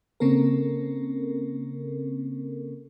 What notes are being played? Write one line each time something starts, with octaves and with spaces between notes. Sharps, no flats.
C#3 A#3 C4 C#4 A4 A#4